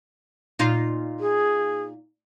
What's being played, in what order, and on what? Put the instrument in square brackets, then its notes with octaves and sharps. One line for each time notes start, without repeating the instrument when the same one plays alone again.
[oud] A#2 D#4 F4
[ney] G#4